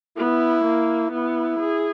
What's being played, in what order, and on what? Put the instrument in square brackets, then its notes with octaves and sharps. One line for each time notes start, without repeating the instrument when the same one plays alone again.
[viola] B3 [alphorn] E4
[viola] A#3
[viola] B3 [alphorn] E4
[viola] G#4